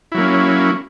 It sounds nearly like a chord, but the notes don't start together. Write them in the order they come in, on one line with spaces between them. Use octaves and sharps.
E4 F#3 A#3 C#4